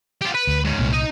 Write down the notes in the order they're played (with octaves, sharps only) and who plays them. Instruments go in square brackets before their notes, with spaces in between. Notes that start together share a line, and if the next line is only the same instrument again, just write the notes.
[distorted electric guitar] F4 G4
B4
[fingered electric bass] D2
[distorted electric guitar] G#2 C#4
[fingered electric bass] C2 A#2
[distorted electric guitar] D#4 D#5